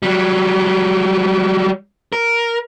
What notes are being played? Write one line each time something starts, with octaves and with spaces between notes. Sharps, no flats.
F#3 G3
A#4